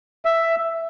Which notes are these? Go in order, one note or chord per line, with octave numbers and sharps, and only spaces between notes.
E5